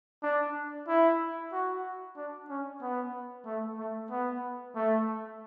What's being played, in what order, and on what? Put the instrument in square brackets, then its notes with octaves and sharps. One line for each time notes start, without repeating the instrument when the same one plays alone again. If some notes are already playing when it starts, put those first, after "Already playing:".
[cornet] D4
E4
F#4
D4
C#4
B3
A3
A3
B3
A3